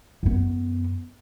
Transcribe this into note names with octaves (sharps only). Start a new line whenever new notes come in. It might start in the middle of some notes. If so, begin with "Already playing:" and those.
F#2 B3